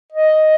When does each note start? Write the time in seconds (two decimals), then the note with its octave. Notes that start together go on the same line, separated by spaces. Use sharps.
0.13 D#5